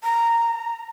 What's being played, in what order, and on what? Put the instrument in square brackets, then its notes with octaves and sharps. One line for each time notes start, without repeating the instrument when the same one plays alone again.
[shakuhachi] A#5